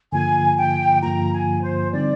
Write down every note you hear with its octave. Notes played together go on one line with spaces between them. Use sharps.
G2 D3 F3 A#3 F4 G#5
G5
G2 D3 F3 A#3 F4 A#5
G#5
C5
D3 G3 C4 D#4 D5